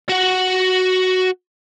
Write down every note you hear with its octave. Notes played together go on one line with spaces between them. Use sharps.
F#4 F#5